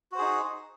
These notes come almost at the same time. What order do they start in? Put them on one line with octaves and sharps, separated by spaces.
F#4 C5 G#4 D#4